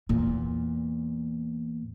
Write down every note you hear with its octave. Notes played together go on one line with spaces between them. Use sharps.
E2 A#2